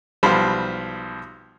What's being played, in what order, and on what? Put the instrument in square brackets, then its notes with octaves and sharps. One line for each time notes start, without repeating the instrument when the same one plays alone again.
[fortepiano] B1 F3 G3 C5 B5